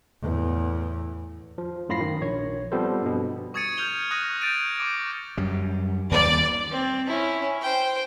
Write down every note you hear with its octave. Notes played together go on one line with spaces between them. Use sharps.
E2 A2
F3
F#2 A2 F4 B5 A#6 C7
D#3
A#1 C#5
F3 G3 B3 C4 A4 C5
G2 B2
C#6 D#6 G#6 A6 C#7 D#7
F6 G6 F7 G7
C#6 D#6 F#6 A#6 D#7 F7
G6 A6 D7 D#7
C#6 D6 D7
F#2 G3
D#2 G3 D5
C4
C#4 E4
C5 G5